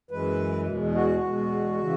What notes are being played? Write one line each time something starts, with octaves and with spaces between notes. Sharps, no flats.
F#2 E3 G#3 B4
E2 B2 G#3
F#4
E2 B2 G#3
C#3 E3